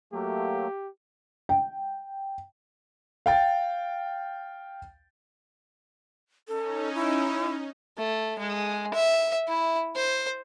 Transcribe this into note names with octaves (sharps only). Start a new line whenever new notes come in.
F#3 A3 A#3 G4
G5
F5 G5 A6
C#4 D#4 A4
E4
A3
G#3
E5
E4
C5